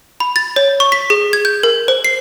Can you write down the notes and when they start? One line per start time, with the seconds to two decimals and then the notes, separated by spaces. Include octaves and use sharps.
0.20 B5
0.36 A6
0.56 C#5
0.80 C#6
0.92 B6
1.10 G#4
1.33 G#6
1.45 G6
1.63 A#4
1.88 C5
2.04 C7